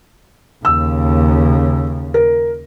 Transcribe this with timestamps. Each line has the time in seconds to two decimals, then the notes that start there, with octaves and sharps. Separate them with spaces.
0.65 D#2 C#3 E6
2.14 A#4